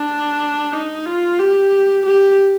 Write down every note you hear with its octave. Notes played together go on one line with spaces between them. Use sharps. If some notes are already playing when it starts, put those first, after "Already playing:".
Already playing: D4
D#4
F4
G4
G4